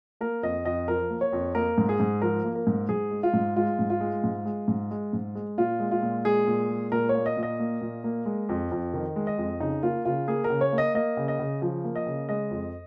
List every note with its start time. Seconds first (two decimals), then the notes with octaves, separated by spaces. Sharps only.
0.21 A#3 A#4
0.43 F2 D#5
0.65 F2 D#5
0.88 F3 A#4
1.10 A#3
1.21 C#5
1.33 F2
1.55 A#3 A#4
1.78 G#2
1.89 G#4
2.00 G#2
2.22 F3 A#4
2.45 A#3
2.55 A#4
2.67 G#2
2.89 G#2 G#4
3.11 G#3
3.23 F4
3.33 G#2
3.56 G#3 F4
3.79 G#2
3.90 F4
4.01 G#3
4.24 G#2
4.46 G#3
4.68 G#2
4.91 G#3
5.13 G#2
5.35 G#3
5.58 A#2 F4
5.80 G#3
5.91 F4
6.03 A#2
6.25 G#3 G#4
6.47 A#2
6.69 G#3
6.92 A#2 A#4
7.09 C#5
7.15 A#3
7.26 D#5
7.37 A#2
7.43 D#5
7.59 A#3
7.81 A#2
8.04 A#3
8.26 G#3
8.49 F2
8.71 F2
8.94 D#3
9.16 G#3
9.27 D#5
9.38 F2
9.60 C#3 D#4
9.83 A#3 F4
10.05 C#3 F4
10.28 A#3 G#4
10.44 A#4
10.50 C#3
10.61 C#5
10.72 A#3
10.78 D#5
10.95 A#3 D#5
11.17 C#3
11.28 D#5
11.39 C#3
11.62 F3
11.84 A#3
11.96 D#5
12.07 C#3
12.29 G#3 D#5
12.51 F2